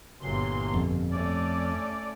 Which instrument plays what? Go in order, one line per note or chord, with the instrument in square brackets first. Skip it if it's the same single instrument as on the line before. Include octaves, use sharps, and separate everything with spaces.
[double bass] G1 A#2 [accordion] E3 F#3 C6
[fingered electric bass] F2
[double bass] A3 C#4 [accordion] D5